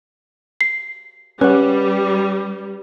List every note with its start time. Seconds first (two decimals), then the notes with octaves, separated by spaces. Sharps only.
0.61 C7
1.41 G3 C#4 B4 F#5